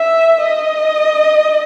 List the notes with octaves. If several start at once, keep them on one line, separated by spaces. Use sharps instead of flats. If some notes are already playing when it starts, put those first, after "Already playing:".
Already playing: E5
D#5